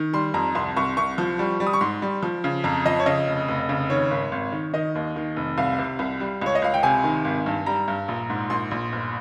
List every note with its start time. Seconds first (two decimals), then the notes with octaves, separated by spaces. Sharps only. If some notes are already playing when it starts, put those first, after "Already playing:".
Already playing: D#3
0.13 G3 C6
0.34 F2 A#5
0.55 C2 C6
0.76 C2 C#6
0.97 C2 C#6
1.18 F3
1.39 G3
1.60 G3
1.67 D#6
1.73 C#6
1.81 G#2 C6
2.02 G3
2.23 F3
2.44 C#3
2.64 F2 A#5
2.85 F3 D#5
2.99 C#5
3.06 C#3 D#5
3.27 F1
3.48 F1
3.69 C#3
3.90 D#3 C#5
4.11 G#1
4.32 G#1
4.52 D#3
4.73 D#3 D#5
4.95 D#2
5.16 D#3
5.36 F1
5.58 C2 F5
5.79 C3
5.99 C2
6.20 G3
6.42 C#2 C#5
6.55 D#5
6.62 C#2 F5
6.74 G5
6.83 C3 G#5
7.04 D#3
7.25 G#1
7.46 G2
7.66 G3 A#5
7.88 G2
8.08 A#1
8.30 G#2
8.50 A#1 C6
8.71 A#1
8.92 G1